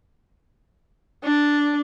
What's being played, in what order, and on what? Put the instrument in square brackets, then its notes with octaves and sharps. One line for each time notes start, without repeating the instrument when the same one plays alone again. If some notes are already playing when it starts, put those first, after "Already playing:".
[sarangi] D4